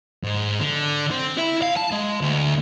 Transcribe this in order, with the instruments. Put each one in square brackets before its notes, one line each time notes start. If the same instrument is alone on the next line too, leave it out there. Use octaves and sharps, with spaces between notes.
[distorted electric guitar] G#2
D3
C4
E4
F5
A5
G#3
D2